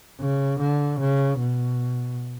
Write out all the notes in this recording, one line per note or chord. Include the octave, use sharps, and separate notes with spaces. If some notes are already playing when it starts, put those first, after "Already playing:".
C#3
D3
C#3
B2